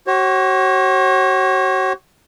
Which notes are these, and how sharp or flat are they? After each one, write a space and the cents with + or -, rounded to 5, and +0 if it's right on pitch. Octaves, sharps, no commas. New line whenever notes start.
F#4 +35 C#5 -40